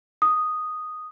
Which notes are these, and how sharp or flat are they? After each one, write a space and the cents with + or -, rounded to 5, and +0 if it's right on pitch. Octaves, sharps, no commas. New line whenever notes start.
D#6 -5